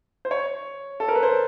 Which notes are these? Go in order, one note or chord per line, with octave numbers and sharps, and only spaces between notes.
C5
C#5
A4
A#4
B4
C5